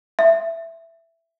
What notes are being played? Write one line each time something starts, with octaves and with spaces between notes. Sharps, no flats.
E5